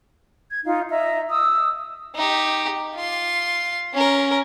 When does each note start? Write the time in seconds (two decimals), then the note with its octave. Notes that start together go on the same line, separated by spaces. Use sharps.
0.49 G#6
0.65 D#4 F4 F5
0.90 D#5 E5 A#5
1.29 D#6 E6
2.16 D#4 G4
2.95 F4 C6
3.93 C#4 A#4